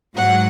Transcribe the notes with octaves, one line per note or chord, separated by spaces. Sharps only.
G#2 F#3 F#5